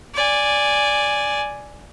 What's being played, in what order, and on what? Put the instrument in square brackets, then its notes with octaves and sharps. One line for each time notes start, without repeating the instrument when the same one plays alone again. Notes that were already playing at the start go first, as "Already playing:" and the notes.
[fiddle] D5 G#5